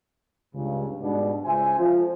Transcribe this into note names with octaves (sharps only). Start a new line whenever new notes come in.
C#2 G2 C#3
G#2 B2 G3 D4
C#2 C5 E5 G#5
F2 F3